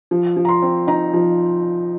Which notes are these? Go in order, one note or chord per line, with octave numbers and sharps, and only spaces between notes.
F3
F3
A#5
C6
C4
D#4 A#5
F3